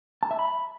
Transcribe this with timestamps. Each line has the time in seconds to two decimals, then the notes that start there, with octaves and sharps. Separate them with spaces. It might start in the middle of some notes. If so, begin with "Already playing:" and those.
0.23 A5
0.31 E5
0.39 B5